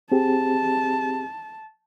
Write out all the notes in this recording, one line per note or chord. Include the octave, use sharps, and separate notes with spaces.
C4 G4 G#4 A5